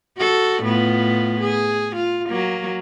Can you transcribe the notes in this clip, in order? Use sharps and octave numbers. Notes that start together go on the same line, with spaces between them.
F#4 A4
A2 B3 F4
G#4
F4
F#3 A#3